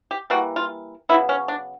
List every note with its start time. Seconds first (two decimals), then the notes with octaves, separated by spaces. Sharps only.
0.11 G4
0.30 E3 G3 A#3 F#4
0.56 F4
1.09 C#3 F#3 B3 E4
1.29 C#4
1.48 D4